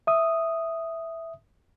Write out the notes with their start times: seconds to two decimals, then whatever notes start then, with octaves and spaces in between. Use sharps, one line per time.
0.07 E5 D#6